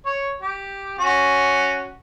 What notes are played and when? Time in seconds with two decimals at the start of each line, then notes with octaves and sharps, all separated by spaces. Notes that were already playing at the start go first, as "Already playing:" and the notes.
0.06 C#5
0.41 G4
0.99 C#4 F#4